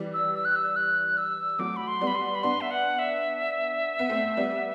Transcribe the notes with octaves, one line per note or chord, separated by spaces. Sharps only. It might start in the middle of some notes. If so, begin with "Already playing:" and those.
Already playing: E3 G3
E6
E6
F#6
E6
F#6
E6
F#3 A3 D6
B5
C6
G3 B3
B5
C6
B5
B3 D4 C6
E5
F#5
E5
B3
A3 C4
G3 B3